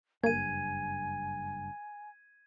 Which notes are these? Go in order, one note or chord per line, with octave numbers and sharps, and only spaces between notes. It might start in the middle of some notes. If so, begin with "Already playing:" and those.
F#1 G2 A#3 G#5 G#6 D#7